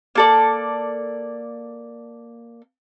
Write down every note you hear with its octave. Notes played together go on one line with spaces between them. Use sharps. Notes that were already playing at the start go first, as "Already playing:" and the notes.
A#3 A4 D5